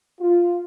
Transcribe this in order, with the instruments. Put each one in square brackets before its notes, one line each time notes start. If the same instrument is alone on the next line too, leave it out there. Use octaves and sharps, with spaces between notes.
[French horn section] F4